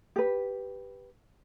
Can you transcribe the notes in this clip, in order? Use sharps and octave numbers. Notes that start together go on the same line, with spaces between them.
G4 B4